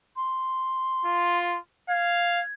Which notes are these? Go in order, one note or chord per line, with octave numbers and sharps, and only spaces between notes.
C6
F4
F5 G#6